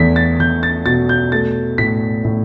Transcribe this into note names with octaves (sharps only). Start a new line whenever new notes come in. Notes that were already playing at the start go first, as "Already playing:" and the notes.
Already playing: E2 A3 B6
A6
E2 G6
A6
B2 A6
G6
A3 A6
A2 B6
A2